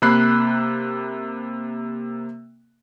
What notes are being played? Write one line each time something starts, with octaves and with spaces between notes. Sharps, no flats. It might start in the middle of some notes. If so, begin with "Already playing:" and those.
C3 A#3 B5 F#6 C7